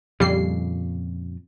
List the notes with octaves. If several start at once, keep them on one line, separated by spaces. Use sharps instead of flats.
F2 A#2 C#3 G3 C7